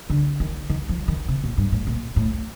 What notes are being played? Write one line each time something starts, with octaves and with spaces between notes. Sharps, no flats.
D3
D#3
D#3
F3
D#3
C3
A#2
G2
A2
A#2
A2